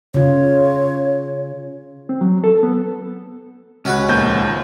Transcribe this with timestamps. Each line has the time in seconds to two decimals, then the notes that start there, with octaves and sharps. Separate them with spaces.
0.14 C#3 F4 C#5
2.09 C4
2.21 F#3
2.44 A4
2.63 B3
3.85 C#2 C#4 F#4 B4
4.08 A#1 D#2 G6